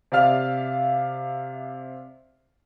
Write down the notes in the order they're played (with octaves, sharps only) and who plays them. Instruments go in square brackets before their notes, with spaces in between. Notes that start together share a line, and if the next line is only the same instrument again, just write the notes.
[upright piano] C3 D5 E5 F5 F6 F7